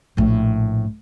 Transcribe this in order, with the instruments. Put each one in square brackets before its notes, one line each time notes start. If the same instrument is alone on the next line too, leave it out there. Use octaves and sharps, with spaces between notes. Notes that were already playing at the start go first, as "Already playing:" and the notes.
[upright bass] A#1 A2